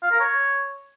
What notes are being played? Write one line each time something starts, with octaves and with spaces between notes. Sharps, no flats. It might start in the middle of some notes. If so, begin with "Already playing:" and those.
F5
A#4
C#5